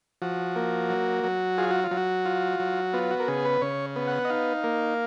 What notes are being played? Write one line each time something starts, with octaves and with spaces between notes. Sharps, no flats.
F3 F#4
A#3
F#3
F#3
F4 G#4
F#4
F4
F#3
F#4
F4
F#3
B3 F4
F#4
A#4
C#3 G#4
B4
C#3 C#5
B3
F#5
D#5
D#4 F5
A#3